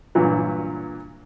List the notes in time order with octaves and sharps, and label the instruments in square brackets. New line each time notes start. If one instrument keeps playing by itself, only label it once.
[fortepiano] G2 A#2 E3 F#3 B4